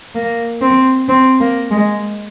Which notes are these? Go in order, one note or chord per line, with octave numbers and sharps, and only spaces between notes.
A#3
C4
C4
A#3
G#3